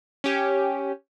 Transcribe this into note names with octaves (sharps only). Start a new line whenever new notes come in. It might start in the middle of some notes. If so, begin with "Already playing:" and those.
C#4 G4